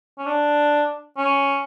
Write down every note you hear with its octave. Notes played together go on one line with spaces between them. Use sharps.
C#4
D4
C#4